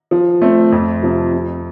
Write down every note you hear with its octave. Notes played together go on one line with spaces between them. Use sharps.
F3
A3 C4
F2
C3 F3
F2